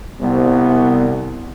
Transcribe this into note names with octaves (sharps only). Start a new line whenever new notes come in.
C2 B3